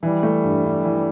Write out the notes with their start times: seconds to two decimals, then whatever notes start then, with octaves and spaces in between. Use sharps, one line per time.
0.03 E3 G3
0.23 A3
0.43 G2
0.64 G2
0.84 E3